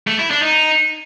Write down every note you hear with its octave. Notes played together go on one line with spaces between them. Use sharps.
A3
E4
D4
D#4